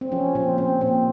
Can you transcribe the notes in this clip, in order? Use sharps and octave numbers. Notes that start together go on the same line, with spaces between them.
C4
F3 C#4
A#2 C4
A#2 C4
A#2 C4